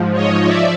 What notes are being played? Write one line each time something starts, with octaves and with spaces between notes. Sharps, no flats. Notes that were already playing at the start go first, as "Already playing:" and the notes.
Already playing: G#2 F3
C#5 D#5
F3 D5 E5